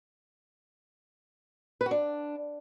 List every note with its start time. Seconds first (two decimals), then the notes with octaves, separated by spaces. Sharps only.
1.81 B4
1.86 F#4
1.91 D4